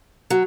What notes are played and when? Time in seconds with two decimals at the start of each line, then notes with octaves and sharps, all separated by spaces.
0.30 F#3